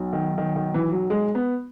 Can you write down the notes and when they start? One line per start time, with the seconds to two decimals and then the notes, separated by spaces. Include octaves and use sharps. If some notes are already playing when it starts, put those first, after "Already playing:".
Already playing: B1
0.13 D#3
0.38 D#3
0.56 D#3
0.74 E3
0.92 F#3
1.10 G#3
1.35 B3